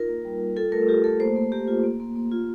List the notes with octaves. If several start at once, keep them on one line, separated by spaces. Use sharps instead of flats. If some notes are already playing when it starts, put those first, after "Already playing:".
Already playing: D#4 F4 A#4
A#3
G3
G3
F4 A4
A3 A#4
F4 G4
A3 A4
A#3 C5
A#3
A#3 G4
F4
A#3
A#3
A#3
F4